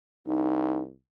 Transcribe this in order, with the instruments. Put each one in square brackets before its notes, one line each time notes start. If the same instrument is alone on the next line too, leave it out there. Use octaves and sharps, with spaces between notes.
[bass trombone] C2 [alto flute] D#4